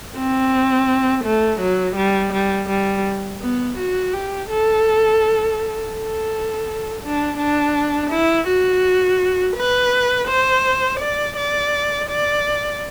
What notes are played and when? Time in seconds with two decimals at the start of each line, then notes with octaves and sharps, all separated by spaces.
0.17 C4
1.24 A3
1.60 F#3
1.96 G3
2.33 G3
2.69 G3
3.42 B3
3.78 F#4
4.14 G4
4.50 A4
5.94 A4
7.03 D4
7.38 D4
8.11 E4
8.47 F#4
9.56 B4
10.28 C5
11.00 D5
11.37 D5
12.09 D5